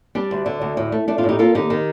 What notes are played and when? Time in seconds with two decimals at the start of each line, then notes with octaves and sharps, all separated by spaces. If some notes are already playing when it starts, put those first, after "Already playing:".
0.15 G3 D4
0.31 D2
0.46 D3
0.61 D2
0.77 A2
0.92 A3
1.08 A3 D4
1.18 D4 F4
1.23 A2
1.29 D#4 G4
1.39 A#3 F4 A4
1.55 D#2 D#4 G4
1.70 D#3